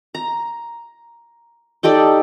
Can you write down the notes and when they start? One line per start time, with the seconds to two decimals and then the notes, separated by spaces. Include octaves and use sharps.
0.15 A#5
1.83 D#4 G4 A4 D5